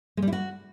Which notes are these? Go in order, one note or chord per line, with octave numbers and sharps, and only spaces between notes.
G#3
G3
E4
F#4